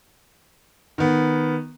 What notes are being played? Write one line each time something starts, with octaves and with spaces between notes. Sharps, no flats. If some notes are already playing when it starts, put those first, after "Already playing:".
D#3 B3